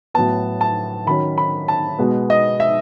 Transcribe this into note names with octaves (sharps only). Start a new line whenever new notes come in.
A2 F#3 B3 A5
A5
D#3 F#3 C#4 B5
B5
A5
B2 G#3 B3
D#5
E5